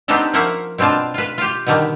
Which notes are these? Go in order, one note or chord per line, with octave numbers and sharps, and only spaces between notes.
B3 C4 D4 D#4 G4 A4
F3 A#3 C#4 E5 F#5
B2 C4 D4 F4 A5
F4 B4
F4 G4
B2 D3 D#3 G3